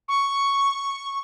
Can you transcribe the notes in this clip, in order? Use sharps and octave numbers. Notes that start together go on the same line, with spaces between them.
C#6